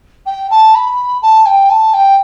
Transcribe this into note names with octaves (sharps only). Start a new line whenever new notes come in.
G5
A5
B5
A5
G5
A5
G5